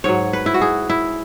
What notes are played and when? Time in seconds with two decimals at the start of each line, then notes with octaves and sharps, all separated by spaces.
0.04 G#2 F#3 C#5
0.33 B4
0.46 E4
0.54 F#4
0.61 G#4
0.90 E4